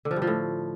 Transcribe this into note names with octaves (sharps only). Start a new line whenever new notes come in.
D3
F3
G2
F3
A2